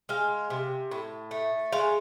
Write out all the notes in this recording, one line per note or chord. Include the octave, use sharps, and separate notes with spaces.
G#3 F5
C3
A2
A3
G#3 F5